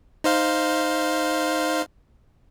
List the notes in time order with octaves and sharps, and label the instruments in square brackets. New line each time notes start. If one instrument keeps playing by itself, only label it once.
[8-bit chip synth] D#4 C5 F5